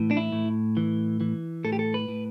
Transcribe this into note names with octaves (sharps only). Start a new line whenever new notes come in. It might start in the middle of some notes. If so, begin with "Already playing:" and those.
Already playing: A2 E3
D4
E4
A2
E3
E3
A2 A4
G4
A4
B4
A2